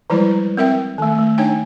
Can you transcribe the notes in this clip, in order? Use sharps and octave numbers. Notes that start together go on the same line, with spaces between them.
E3 F3 G3 G#3 E4 B4
C4 A#4 E5 G5
D#3 A3
A3
D4 D#4 C#5 G5 G#5